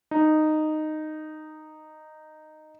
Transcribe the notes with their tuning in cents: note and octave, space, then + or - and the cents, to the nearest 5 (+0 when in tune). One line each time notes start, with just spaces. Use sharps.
D#4 -10